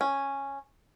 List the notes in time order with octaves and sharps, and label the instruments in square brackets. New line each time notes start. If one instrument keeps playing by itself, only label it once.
[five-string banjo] C#4